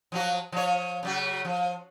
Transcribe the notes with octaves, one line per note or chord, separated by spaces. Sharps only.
F3 F#3 F#4
F3 C#5
C#3 F#3 F#4
F3